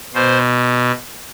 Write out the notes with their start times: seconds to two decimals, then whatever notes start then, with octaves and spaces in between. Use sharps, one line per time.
0.14 B2 C5